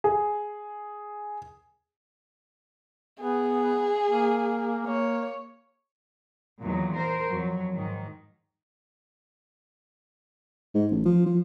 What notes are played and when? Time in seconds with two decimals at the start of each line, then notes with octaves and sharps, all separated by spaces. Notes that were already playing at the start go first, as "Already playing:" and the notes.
0.04 G#4
3.21 B3 G#4
4.09 A#3
4.87 A#3 C#5
6.61 E2 A#2 D#3 F#3
6.95 A#4 C5
7.28 F2 F#3
7.74 G#2 D#3
10.74 G#2
10.91 A1
11.05 F3
11.26 F3